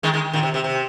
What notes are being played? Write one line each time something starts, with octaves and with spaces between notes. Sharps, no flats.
D#3 G#3
D#3 G#3
A#2 D#3
C3
C3
C3